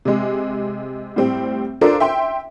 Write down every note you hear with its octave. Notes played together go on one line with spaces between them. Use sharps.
C3 G#3
A2 G3 C4
D4 F4 A4 A#4 C5
E5 G5 C6